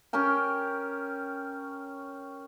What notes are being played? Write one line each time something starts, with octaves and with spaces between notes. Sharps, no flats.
C#4 G4 A#4 G5